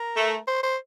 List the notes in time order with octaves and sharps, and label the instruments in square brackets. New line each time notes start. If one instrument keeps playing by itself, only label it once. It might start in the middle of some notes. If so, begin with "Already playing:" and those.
Already playing: [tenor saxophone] A#4
[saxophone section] A3
[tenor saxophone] C5
C5